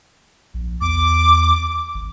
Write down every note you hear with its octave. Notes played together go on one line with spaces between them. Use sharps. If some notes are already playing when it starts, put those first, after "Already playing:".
A#1
E2 D6
G#1